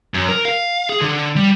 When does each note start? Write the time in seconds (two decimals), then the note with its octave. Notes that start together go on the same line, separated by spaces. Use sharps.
0.14 F#2
0.29 A#4
0.45 F5
0.89 G#4
1.01 D3
1.36 G3